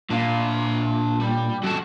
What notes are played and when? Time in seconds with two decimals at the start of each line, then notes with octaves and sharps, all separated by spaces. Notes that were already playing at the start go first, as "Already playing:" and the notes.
0.10 A#2 D4 F5
1.20 G3
1.63 F#2 F#4 A4